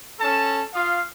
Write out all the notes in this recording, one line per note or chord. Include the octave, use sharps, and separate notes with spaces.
C#4 A4 A5
F4 F5 D#6